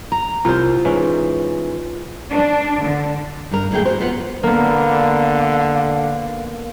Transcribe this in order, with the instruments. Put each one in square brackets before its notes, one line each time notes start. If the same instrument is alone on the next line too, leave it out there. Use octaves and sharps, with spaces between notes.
[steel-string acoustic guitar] A#5
[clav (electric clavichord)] C2 A#4 [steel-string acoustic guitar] F4 C5
[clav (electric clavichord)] G#2 E3 C#4
[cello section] D4
D3
[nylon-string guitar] G2 A#4
F#2 A2 D3 A#3 G#4 G5
F#4 A#4 C5
F2 B3 F4 B4 F#5
[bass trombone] D3 [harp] A#3 B3 [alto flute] F5